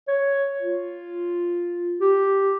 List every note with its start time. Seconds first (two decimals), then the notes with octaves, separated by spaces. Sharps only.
0.08 C#5
0.62 F4
2.01 G4